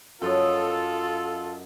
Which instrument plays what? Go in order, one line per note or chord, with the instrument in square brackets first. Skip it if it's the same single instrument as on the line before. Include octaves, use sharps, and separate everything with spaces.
[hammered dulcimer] F#2 D#5 [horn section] F4 A4